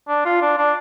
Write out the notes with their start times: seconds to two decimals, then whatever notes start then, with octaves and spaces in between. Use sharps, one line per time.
0.08 D4
0.25 F4
0.42 D4
0.58 D4